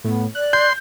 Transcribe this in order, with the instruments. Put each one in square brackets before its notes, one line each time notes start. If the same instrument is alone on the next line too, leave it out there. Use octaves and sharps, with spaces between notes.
[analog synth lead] A2 [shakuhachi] B3
[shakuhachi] D5 [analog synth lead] F#6
[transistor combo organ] C6 [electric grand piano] G6